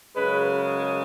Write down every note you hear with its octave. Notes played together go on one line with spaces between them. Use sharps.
F#2 C#3 G#3 B4